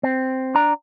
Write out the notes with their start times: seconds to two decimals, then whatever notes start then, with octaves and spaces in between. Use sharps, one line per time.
0.03 C4
0.55 D4 D5 A#5